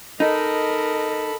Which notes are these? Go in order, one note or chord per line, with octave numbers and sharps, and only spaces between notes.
D#4 A4 A#4 D#5 B5